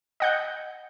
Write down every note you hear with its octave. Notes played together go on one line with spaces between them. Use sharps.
D#5 F#5 G6